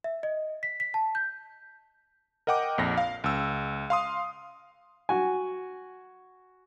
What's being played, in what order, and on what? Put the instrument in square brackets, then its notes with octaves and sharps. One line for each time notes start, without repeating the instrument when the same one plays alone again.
[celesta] E5
D#5
B6
B6
A5
G6
[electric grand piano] A#4 D#5 F#5 G5 D6
A#1 F2 A#6
F5
C#2 E6
F5 C6 D#6
[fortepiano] F#4 G#5